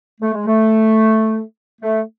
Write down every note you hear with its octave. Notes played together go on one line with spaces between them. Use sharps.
A3
G#3
A3
A3